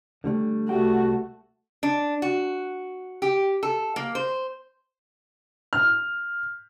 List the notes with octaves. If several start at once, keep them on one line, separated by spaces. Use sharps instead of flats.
D3 G3 A3
C2 A3 F#4 G4 G5
D4
F#4
G4
A4
A#3
C5
F6